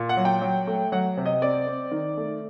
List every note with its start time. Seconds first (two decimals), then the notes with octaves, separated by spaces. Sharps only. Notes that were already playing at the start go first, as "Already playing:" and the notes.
Already playing: A#2
0.09 F#5
0.17 F#3
0.25 G5
0.41 F#3
0.67 A3
0.92 F#3 F#5
1.17 C3
1.26 D#5
1.42 C4 D5
1.67 C4
1.92 D#3
2.17 A3